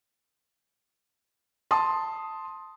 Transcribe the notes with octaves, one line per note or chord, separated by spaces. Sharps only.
A5 C6 D#6